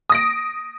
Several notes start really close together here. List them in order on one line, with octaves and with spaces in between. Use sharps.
D#6 A#6 D7